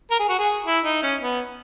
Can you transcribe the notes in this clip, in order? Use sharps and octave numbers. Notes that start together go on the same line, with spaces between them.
A#4
G#4
F#4
G#4
E4
D#4
C#4
B3